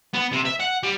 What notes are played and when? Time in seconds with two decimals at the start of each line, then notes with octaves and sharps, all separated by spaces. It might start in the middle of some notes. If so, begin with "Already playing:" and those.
0.14 B3
0.32 C3
0.46 E5
0.60 F#5
0.83 G3